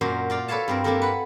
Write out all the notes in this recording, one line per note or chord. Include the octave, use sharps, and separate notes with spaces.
F#2 A#2 F#4 C5
F4 D5 F5
A4 B4 C#5 F5 A5
G2 C4 A#4
A#3 C4 E4 G4 A4 A#4
B4 F#5 B5